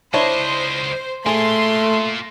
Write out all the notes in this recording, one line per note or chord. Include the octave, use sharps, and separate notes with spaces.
C#2 D4 E4 C5 C#5 D#5
A3 A#3 F4 G#4 C6